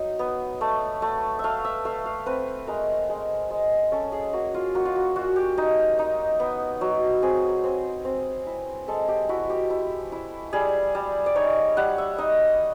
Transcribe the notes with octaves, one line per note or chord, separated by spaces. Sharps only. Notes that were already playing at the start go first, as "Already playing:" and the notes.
Already playing: F#3 D#4
B3
A3
A3
A3 E5 F5
E5
A3 F5
F5
C4 B4
G#3 A#4
G#3
G#3
C#4 A4
G#4
A#3 F#4
F4
A#3 F#4
F4
F#4
F4 F#4
G4
D#4
D#4
B3
F#3
C4 G#4
C4
C4
E4
G#3 A4
G4
E4 F#4
G4
E4
E4
G3 G#4
G3
D5
D#4 C#5
G3 F#5
E5
D#4 D#5